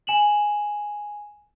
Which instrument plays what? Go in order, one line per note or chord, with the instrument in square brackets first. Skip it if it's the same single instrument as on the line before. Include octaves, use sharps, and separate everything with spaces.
[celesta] G#5 E7 F#7